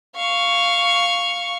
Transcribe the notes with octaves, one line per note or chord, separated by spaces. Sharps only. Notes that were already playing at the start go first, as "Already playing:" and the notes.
F5 C#6